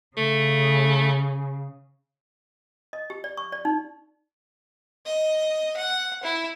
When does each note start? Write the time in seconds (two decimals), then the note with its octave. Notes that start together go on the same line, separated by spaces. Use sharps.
0.17 C#3 A3
2.93 D#5
3.10 G4
3.24 D5
3.37 C#6
3.52 D5
3.65 D#4
5.06 D#5
5.76 F#5
6.23 E4